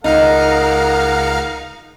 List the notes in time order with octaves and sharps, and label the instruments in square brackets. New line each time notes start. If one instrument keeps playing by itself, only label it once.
[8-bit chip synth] C#2 F5 A#5 [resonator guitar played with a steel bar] D#4 [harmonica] A#4 F#5